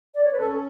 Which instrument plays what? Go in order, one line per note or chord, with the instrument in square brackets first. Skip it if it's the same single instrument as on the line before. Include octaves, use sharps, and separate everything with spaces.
[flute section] D5
C#5
B4
[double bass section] C#4 [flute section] A4